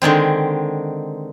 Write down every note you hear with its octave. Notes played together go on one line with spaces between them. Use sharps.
D3 D#3 G#3 C4